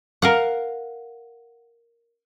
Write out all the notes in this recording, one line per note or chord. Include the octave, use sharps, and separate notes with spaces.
A#4 F5 F#5